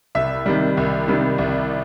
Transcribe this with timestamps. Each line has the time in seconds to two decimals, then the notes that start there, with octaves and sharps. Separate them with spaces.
0.15 C2 E5
0.46 C3 D#3 G3
0.77 C2
1.08 C3 D#3 G3
1.38 C2